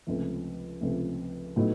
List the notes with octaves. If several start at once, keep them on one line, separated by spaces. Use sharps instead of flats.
C#2 C3 F3 A3
C#2 C3 F3 A3
A2 F#3 B3 D#4